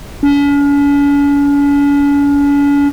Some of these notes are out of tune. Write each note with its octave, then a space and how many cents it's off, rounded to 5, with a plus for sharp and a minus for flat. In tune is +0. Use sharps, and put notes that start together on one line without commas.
C#4 +45